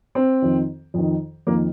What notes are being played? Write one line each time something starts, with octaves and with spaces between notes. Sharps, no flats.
C4
F2 D#3
F2 D#3
F2 D#3 A#3